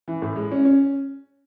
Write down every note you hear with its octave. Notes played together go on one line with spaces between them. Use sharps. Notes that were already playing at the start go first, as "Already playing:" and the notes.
E3
A2
G#3
C#4
C#4